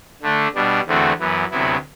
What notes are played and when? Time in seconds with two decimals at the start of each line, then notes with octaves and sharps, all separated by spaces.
0.22 D3 A3 D4
0.55 B2 G3 D4
0.87 E2 D3 A3 C4 F#4
1.19 F#2 E3 B3
1.51 D2 C3 F#3 B3 E4